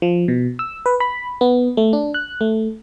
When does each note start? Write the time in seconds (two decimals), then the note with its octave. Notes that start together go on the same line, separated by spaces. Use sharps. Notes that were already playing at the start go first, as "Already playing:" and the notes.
0.02 F3
0.28 B2
0.59 E6
0.86 B4
1.00 B5
1.41 B3
1.77 A3
1.93 D4
2.14 F#6
2.41 A3